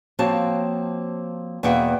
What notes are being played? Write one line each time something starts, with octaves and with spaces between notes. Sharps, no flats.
F3 A#3 C4 F#4 C#5 A5
E2 B2 A#3 E5 F#5 G5